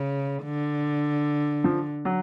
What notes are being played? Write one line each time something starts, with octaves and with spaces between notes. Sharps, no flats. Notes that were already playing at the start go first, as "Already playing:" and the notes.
Already playing: C#3
D3
F3
F#3